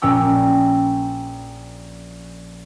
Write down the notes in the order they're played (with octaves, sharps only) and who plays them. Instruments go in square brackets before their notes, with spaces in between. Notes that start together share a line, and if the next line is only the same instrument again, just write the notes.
[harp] A#1 A#2 C#4 G5 E6